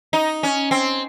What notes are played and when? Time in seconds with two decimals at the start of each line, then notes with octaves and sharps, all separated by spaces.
0.13 D#4
0.43 C#4
0.71 C4